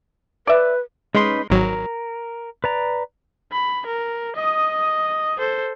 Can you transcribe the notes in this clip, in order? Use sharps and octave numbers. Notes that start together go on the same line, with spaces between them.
B4 D5 E5
G#3 C#4 D#4 B4 C6
G#1 F#3 A#4
B4 D5 A#5
B5
A#4
D#5 D#6
A4 C5